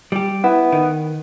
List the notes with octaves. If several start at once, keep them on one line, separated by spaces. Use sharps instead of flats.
G3 G4
B3 E4
D#3